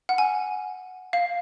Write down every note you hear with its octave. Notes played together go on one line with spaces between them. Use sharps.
F#5
G#5
F5